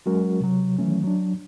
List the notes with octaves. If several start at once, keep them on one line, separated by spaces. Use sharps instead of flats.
F#3 G#3 C#4 F#4 A#4
C3 F#3
D#3 E3 F#3 A3 C#4
F#3 D4